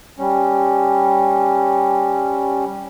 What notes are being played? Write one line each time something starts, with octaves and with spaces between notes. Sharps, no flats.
G3 C#4